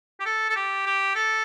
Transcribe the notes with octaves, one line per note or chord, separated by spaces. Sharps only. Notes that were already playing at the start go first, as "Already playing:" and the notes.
G4
A4
A4
G4
G4
A4